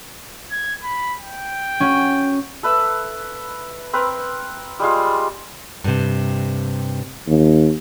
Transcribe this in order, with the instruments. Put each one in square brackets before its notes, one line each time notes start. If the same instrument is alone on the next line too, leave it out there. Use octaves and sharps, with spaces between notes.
[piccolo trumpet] G#6
B5
G5
[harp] C#4 F#4
[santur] A4 B4 E5
C4 A#4 B4
G3 G#3 F4
[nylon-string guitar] G2 C3
[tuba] D#2